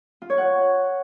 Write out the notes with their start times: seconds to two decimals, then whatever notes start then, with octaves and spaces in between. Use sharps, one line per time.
0.22 F4
0.30 C#5
0.38 F#5